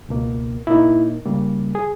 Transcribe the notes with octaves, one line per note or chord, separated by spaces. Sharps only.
C#2 B2 A#3
A#2 A#3 D#4 E4
C#3 G3 A#3
G#4